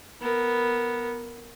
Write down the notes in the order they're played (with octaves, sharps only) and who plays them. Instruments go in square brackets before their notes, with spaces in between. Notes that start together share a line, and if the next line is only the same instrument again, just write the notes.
[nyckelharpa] B3 A#4